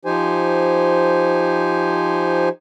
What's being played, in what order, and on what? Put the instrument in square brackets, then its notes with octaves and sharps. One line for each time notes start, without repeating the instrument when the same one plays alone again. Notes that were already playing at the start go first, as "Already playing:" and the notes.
[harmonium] F3 D#4 G4 C5 G#5